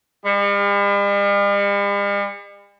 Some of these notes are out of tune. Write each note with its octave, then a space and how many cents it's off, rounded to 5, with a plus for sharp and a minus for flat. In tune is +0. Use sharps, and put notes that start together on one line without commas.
G3 +45